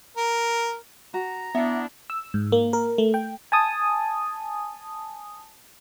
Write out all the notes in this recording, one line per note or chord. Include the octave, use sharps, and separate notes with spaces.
A#4
F#4 A#5
B3 D4 E4 E5
E6
G#2
A#3
A#4
A3
G5
G#5 A5 D#6